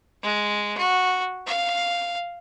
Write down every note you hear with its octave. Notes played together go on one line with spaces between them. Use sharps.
G#3
F#4
F5